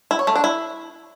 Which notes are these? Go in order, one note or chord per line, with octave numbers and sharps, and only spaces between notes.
E4
C#5
A3
D4
E4